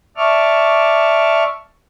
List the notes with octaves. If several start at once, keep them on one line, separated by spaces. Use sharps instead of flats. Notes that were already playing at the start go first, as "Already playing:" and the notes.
D5 E5 A5 C#6 D6 F6